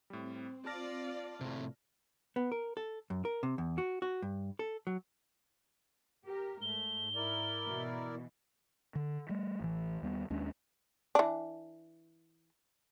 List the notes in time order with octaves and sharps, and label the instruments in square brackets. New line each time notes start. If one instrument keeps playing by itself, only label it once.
[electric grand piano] A2 G3 [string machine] C4
[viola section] F4 D5 [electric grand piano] A5 F6 A#6
[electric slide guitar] A2 C3
[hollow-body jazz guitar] B3
A#4
A4
F#2
A#4
C3
E2
F#4
F#4
G2
A4
F#3
[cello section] G4 A#4
[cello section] G#2 [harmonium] A3 [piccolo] G7
[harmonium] E4 A#4 D5
[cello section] B2 E3
[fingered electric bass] D3
G3 A3
A1 E3
D#2 G3 B3
D#2 G#3 C#4 D4
[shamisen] E3 D4